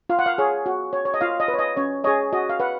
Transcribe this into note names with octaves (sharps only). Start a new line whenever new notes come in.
F4 F5
F#5
F5
G#4 C#5
F#4
C#5
C#5
D#5
F4 F5
D#5
B4
C#5
D#5
C#4 C#5
G#4 C#5 D#5
F#4 D#5
F5
B4 F#5